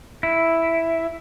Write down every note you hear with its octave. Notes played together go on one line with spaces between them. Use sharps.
E4